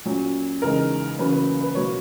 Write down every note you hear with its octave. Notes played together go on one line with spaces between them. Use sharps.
A#2 F#3 C#4
E2 C#3 G#3 D#4 A#4
E2 C#3 F#3 A#3 C#4 B4
B4
B4
B2 F#3 A#3 C#5